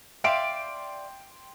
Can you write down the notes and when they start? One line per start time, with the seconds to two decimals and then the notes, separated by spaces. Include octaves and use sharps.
0.24 D5 E5 F5 G5 C6 D7